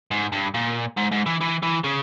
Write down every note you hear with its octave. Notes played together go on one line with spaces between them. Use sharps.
G#2
G2
A#2
G#2
G#2
E3
E3
E3
C#3